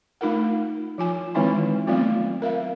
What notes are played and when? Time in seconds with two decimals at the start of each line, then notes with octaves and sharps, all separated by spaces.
0.21 A3 D#4 F4 A#4 F#5
0.98 F3 F4 G#5
1.35 D#3 E3 G#3 C4 D#4 E4
1.87 F#3 A3 B3 C4 F4
2.42 A#4 E5 F5